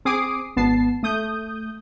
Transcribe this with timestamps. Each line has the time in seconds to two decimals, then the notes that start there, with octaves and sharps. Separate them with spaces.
0.05 C4 G#4 D6 D#6 C7 D7
0.56 G#1 B3 A5 C7
1.03 A3 D#6 G6